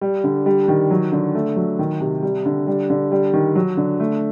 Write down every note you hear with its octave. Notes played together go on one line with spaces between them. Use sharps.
G3
D3
G3
D#3
F#3
D3
A3
F#3
D#3
C3
G3
D3
G3
D3
G3
D#3
F#3
D3
A3